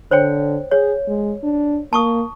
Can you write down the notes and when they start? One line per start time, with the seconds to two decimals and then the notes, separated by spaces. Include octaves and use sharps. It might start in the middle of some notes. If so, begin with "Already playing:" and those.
0.11 D3 C5 C#5 G5
0.71 G#4 C#5
1.08 G#3
1.43 D4
1.93 A#3 A5 C#6 D#6